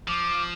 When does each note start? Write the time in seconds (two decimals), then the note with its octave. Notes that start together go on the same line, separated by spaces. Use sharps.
0.08 F3 D6